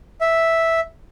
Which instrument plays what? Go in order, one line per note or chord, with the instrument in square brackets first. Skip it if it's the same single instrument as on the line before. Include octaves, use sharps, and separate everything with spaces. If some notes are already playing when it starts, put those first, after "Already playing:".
[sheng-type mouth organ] E5